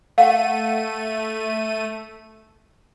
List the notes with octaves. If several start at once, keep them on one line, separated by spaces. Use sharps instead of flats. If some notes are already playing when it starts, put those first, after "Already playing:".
A3 F5 F#5 D#7